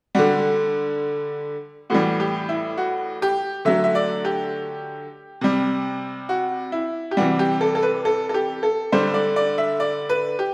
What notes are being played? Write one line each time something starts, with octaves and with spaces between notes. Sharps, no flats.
D3 G3 F#4
A2 E3 G3 F#4
G4
E4
F#4
G4
D3 F#3 A3 E5
E5
D5
G4
C3 G3
F#4
E4
G4
C3 E3 G3 F#4
G4
A4
A4
B4
A4
A4
G4
A4
D3 G3 C5
D5
D5
E5
D5
B4
G4